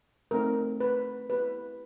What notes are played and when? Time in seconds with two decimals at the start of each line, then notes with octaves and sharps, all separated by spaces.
0.31 A3 C4 D#4 A#4
0.80 B4
1.30 B3 E4 G4 B4